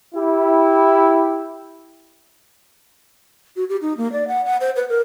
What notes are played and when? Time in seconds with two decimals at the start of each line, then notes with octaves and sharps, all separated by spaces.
0.14 E4 G4
3.56 F#4
3.69 G4
3.82 D#4
3.97 A#3
4.12 D5
4.28 F#5
4.45 F#5
4.61 C5
4.76 B4
4.89 A#4